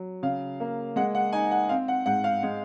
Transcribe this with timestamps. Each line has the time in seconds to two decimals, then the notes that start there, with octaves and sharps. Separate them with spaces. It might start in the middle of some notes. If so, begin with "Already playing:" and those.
Already playing: F#3
0.23 C#3 F5
0.60 A#3
0.96 G#3 F#5
1.15 F#5
1.33 D#4 G#5
1.51 F#5
1.69 C4 F5
1.88 F#5
2.06 G#2 F#5
2.24 F5
2.43 G#3